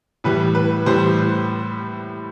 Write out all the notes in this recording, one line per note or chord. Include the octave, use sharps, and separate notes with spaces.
A2 E3 G3 B4
B4
A2 E3 G3 C5